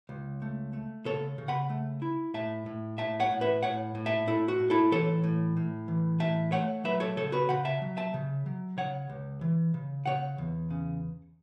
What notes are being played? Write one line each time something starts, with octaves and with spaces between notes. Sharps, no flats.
C#2
A3
A3
C#3 A4 C#5
C#3
F#5 B5
A3
E4
A2 E5 A5
A2
A2 E5 A5
C#5 F#5
A2
B4 E5
A2 C#5 F#5
A2
E5 A5
A2 E4 A4
F#4
A2
E4 A4
E3 A4 C#5
A2
A2
E3
A2 E5 A5
A3 C#5 F#5
F#3 B4 E5
A4 C#5
C#3 A4 C#5
F#4 B4
C#3 F#5 B5
E5 A5
F#3
E5 A5
C#3
F#3
C#3 C#5 F#5
C#2
E3
C#3
C#3 C#5 F#5
E2
C#3